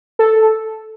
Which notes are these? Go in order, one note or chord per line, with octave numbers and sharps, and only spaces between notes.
A4